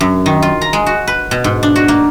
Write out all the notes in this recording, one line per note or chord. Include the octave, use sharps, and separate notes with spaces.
F#2
D#3
F4
A#5
G#3
F#4
B4
B2
G#2
D4
F#4
A#3